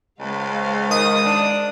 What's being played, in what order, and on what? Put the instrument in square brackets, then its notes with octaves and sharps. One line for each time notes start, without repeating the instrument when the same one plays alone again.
[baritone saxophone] C#2 [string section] G#3 C5 F5
[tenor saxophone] D#3 [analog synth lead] D#6
[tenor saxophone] D4